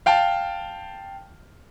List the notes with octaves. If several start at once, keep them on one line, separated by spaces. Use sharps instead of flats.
F5 G5 A5